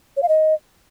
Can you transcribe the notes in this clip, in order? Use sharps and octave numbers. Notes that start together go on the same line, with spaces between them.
C#5
F5
D#5